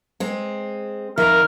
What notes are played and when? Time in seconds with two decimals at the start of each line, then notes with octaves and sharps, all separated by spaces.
0.20 G#3 C4
1.18 F2 D#3 A#4 E5